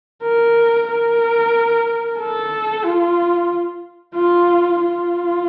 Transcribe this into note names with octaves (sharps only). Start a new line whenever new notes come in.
A#4
A#4
A4
F4
F4
F4